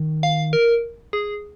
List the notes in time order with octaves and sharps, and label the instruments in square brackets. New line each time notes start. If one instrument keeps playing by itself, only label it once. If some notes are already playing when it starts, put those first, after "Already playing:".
Already playing: [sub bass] D#3
[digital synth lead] F5
A#4
G#4